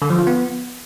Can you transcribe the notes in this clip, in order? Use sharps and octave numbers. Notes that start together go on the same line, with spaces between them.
D3
F3
F4
B3